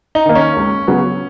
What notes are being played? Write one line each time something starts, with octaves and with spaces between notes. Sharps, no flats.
D#4
D#3 A#3
C#4
C#2
C#3 F#3 B3